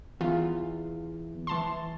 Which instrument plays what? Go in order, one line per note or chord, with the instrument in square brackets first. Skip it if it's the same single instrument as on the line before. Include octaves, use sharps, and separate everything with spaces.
[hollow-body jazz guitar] E2 [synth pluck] F4
[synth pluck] E3 A5 C6